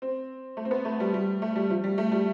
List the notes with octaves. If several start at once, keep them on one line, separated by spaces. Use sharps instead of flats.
C4
A3
C4
B3
A3
G3
G3
A3
G3
F3
G3
A3
G3